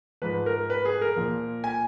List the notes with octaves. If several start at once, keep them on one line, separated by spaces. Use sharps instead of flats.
G#2 F3 B4
A#4
B4
G#4
A#4
A#2 F3
G#5